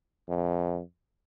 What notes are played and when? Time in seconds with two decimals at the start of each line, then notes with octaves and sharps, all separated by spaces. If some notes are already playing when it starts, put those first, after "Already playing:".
0.29 F2